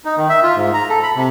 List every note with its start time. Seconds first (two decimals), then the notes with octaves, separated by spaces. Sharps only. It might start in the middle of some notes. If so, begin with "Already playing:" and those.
0.05 D#4
0.17 D#3
0.29 E5
0.43 F4
0.56 G#2
0.74 A#5
0.89 A4
1.03 B5
1.16 C3